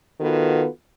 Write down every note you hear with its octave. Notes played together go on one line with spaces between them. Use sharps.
D#3 B3 F4 F#4 A4 B4